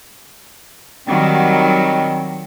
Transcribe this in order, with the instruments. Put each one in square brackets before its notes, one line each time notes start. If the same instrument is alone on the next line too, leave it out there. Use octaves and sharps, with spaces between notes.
[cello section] D#3 F#3 G3 [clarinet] C4